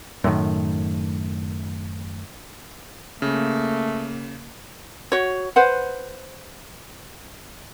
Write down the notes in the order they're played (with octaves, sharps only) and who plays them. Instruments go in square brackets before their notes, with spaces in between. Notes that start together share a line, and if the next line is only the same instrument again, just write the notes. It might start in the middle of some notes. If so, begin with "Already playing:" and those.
[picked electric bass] F#2 A2 D#3
[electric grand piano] C#3 [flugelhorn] A3 [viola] A#3
[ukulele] F#4 C#5
B4 C5 F#5